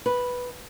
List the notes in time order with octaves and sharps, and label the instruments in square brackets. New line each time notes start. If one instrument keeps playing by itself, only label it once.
[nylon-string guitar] B4